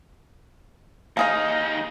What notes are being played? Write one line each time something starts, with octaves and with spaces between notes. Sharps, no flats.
D#2 A#3 D#4 G#4 F5